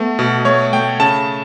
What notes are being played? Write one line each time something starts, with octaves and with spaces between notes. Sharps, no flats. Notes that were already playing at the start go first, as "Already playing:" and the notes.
Already playing: A3 B3
B2
A3 C#5
A3 G5
C#3 A5